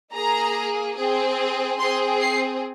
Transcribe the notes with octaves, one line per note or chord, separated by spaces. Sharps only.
A#3 G#4 A#5
C4 G#4
C4 G#4 C6
C7